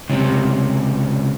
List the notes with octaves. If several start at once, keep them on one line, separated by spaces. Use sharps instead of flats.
C#2 C3